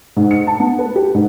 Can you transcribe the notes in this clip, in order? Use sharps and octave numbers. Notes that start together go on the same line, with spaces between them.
G#2
C#7
A5
B3
B4
G4
G#2